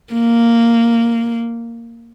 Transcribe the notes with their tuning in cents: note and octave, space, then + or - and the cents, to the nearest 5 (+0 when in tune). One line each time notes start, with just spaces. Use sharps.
A#3 -5